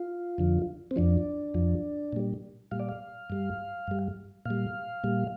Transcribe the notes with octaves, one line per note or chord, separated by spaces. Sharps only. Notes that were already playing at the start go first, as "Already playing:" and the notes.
Already playing: F4
F2 D3 F3
C4
F2 F3 D4
F2 F3
A#2 G3
A#2 G3 F5
D5
F5
G2 G3
G2 G3
A#2 G3 F5
A#2 G3